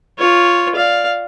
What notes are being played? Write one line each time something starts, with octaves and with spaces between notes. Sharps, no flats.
F4 C#5
D5 F5